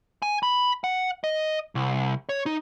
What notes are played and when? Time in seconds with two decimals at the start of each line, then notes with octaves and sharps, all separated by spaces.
0.22 G#5
0.43 B5
0.84 F#5
1.24 D#5
1.75 C2
2.29 C#5
2.46 D#4